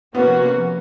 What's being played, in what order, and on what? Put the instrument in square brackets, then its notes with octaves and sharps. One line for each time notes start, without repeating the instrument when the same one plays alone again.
[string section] C3 F3 A#3 C#4 F#4 [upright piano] B3